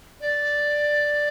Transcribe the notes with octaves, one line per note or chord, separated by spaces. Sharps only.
D5